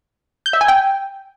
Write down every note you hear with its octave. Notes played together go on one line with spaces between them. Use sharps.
G6
E5
G#5
G5